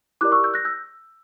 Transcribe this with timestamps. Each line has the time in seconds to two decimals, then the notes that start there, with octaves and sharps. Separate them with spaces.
0.21 E4 G4 A#4 D5 D6 F#6
0.32 C#6 E6
0.44 E6 G6
0.54 F#6 A#6
0.65 E6 G6